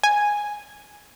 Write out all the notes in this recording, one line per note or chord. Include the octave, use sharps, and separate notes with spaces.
G#5